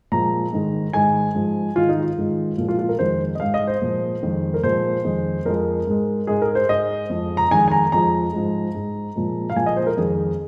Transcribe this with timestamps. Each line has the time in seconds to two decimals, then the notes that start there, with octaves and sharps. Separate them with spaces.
0.12 A#2 F3 G#3 A#5
0.53 G#2 D#3 G#3
0.93 G#2 D#3 G#3 G#5
1.35 G#2 F3 G#3
1.75 G#2 D#3 G#3 F4
1.89 D#4
2.02 F4
2.18 G#2 D#3 G#3
2.58 A#2 F3 G#3 F4
2.69 F4
2.79 F4
2.89 A#4
2.99 F2 D#3 G#3 C5
3.35 D#5
3.40 G#2 G#3 F5
3.54 D#5
3.67 C5
3.82 A#2 F3 G#3
4.23 F2 D#3 G#3
4.54 A#4
4.63 A#2 F3 G#3 C5
5.04 F2 D#3 G#3
5.46 F2 F3 G#3 A#4
5.87 G#2 G#3
6.27 G#2 G#3 G#4
6.42 A#4
6.55 C5
6.69 G#2 G#3 D#5
7.10 F2 F3 G#3
7.37 A#5
7.50 F2 D#3 G#3 G#5
7.68 G#5
7.71 A#5
7.92 F2 F3 G#3 A#5
8.33 G#2 F3 G#3
8.75 G#2 G#3
9.16 A#2 F3 G#3
9.50 F5
9.56 A#2 F3 G#3 G#5
9.66 D#5
9.77 C5
9.87 A#4
9.97 F2 D#3 G#3 G#4